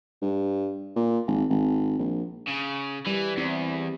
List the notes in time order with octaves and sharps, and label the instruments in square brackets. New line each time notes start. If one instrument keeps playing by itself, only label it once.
[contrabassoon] G2
A#2
G#1
G#1
A#1
[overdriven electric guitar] C#3
[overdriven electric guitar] E3 [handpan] G3
[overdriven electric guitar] E2 [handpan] C4 E4